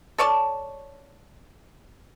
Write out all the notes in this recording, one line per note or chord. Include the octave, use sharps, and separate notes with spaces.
A4 C#5 D5 A5